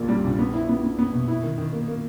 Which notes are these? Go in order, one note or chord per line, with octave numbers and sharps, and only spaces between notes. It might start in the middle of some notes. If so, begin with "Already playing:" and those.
Already playing: A#1 A#2 A#3
G3
A#1
B3
E4
B3
B3
B3
B2
E4
D#3
D#3
A#3
A#3